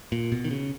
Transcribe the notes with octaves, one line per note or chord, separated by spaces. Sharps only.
A#2
B2
D#3
C#3